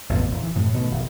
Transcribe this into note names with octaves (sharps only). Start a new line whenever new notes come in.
A1 F2 C3 B3
D#1
E3
F#2 A2 C3
B2 D#3 F#3 A3
F1 B2 D#3